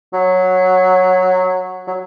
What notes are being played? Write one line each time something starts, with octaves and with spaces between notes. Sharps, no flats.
F#3
F#3